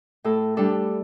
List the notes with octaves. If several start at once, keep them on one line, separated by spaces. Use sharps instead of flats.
A2 A4
G3 D4 A4